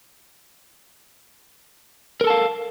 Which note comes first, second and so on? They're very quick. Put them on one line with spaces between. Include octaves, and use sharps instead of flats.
A#4 A4 A5 F5